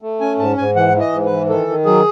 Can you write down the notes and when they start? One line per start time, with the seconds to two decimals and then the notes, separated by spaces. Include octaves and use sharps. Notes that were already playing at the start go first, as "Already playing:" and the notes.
0.02 A3
0.20 C#4 G#5
0.38 G#2 A5
0.57 G#2 G#5
0.76 E3 F#5
0.94 E3
1.00 D#5
1.12 G#2
1.25 B4
1.30 E3
1.49 D#3 A4
1.68 D#3
1.85 F#3 G#4